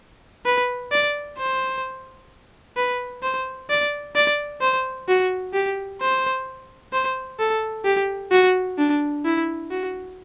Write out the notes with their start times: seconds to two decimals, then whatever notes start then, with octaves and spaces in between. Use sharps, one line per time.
0.46 B4
0.92 D5
1.38 C5
2.77 B4
3.23 C5
3.70 D5
4.16 D5
4.61 C5
5.08 F#4
5.54 G4
6.01 C5
6.93 C5
7.40 A4
7.85 G4
8.32 F#4
8.79 D4
9.25 E4
9.71 F#4